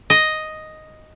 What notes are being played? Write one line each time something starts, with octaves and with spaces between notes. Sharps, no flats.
D#5